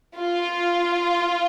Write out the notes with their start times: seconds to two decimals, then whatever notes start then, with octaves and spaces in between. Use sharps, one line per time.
0.16 F4